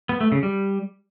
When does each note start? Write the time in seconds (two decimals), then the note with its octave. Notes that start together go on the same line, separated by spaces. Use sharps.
0.09 B3
0.21 A3
0.32 C#3
0.43 G3